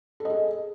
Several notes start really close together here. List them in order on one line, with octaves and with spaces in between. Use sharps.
A4 D#5 G#4